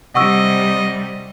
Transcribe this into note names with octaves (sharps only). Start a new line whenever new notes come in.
C3 G3 D#5 F#5 C#6 E6